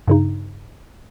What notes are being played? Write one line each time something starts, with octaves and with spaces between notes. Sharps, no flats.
G2 C#3 D#4